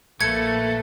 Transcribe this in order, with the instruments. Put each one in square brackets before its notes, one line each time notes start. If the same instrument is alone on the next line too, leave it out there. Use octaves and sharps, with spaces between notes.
[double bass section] A#1 A#3 [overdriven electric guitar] A3 [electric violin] A4 B4 [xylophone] G#6 C#7